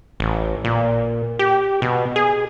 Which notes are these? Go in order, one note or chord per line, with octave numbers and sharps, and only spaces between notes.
A1
A#2
G4
B2
G#4